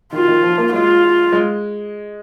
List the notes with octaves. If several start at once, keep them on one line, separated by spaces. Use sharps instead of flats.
D#3 F4
D#3
F3
A#3
G#3 F4
G#3